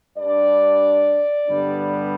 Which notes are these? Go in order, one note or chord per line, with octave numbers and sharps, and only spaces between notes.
G2 G3 D4 D5
G2 D3 G3 B3 D4